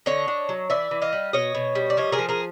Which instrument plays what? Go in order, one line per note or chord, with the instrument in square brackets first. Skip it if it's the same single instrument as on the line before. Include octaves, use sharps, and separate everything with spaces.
[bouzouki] D3 C#5 D#5
D4
F#3
E3 D5 E5
E3
D#5 F5
G3
B2 C#5 D#5
B2
G3
D5
F3 C#5 D#5
G#4 A#4
F3
G#4 A#4